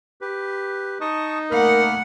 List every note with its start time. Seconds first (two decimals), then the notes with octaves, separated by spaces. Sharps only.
0.21 G4 B4
1.01 D#4 A5 C#6 D#6
1.51 A3 A#3 A#4 F#5 B5 F6